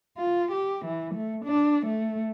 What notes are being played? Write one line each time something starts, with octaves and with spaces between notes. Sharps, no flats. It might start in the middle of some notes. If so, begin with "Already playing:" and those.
F4
G4
E3
A3
D4
A3